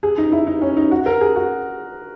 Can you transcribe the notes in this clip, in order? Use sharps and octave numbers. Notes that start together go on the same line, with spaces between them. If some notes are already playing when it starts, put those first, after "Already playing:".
G#4
D#4
E4
D#4
C#4
D#4
F#4
A#4
G#4
F#4